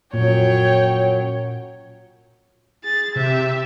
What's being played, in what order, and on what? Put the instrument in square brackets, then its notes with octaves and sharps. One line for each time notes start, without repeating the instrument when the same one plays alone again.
[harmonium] F#2 F#3 [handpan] A#2 [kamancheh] C#5 G5
[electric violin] G#4 A6
[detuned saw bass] C3 [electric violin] G4 E5